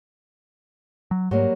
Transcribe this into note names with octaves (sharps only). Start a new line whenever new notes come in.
F#3
G#2 F#3 G3 A#3